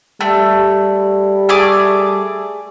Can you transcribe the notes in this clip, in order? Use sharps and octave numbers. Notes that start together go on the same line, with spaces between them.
G3 A3
A3 G#4 D6